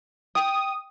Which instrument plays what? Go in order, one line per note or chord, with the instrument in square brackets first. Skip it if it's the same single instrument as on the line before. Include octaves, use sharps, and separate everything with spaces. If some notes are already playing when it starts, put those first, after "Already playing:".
[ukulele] G5 [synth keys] D#6